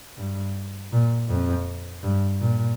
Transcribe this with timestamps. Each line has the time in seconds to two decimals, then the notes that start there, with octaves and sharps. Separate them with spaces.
0.17 G2
0.92 A#2
1.29 F2
2.03 G2
2.40 A#2